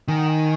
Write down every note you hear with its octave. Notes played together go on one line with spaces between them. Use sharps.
D#3 G#5
F#5
G#5